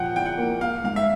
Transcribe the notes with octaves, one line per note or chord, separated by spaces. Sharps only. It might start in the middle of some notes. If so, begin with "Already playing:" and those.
Already playing: A#2 F3 F#5 G5
E2 G5
F#5
A#3
A#3 F5
G#2 F5
E5